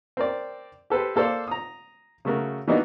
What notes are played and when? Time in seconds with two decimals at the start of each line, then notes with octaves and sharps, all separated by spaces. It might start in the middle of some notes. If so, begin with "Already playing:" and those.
0.17 C4 A#4 D5
0.90 G4 A4 B4 C5
1.16 A#3 A4 C5 D5 F5
1.48 A#5 D#6
2.25 C#3 F#3 A3 F#4 A#4
2.68 E3 A#3 B3 D4 D#4 F#4